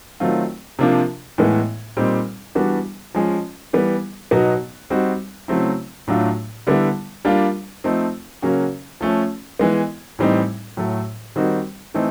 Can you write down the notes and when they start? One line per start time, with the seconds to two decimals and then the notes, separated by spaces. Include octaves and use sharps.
0.20 D#3 F#3 A3 C4 F4
0.79 C3 F3 A#3 D4 F4
1.38 A2 E3 G#3 B3
1.97 A#2 G3 C4 D#4
2.55 E3 G3 B3 D4 F#4
3.15 F3 G#3 C#4
3.73 E3 G3 B3
4.31 B2 F#3 B3 D#4 F#4
4.90 G3 C4 D#4 F#4
5.48 C#3 F#3 A3 C4 E4
6.08 A2 F#3 A3 D4 F4
6.67 D3 G3 B3 E4
7.25 G3 A#3 D4 F4
7.84 F3 A3 C4 D#4
8.42 C#3 F#3 A#3 C#4 F#4
9.01 F3 A3 C#4
9.59 E3 G#3 B3
10.19 A2 E3 G3 C4 D#4
10.77 A2 F#3 A3
11.36 D#3 G3 C4 D#4 F#4
11.94 E3 A3 C4 D#4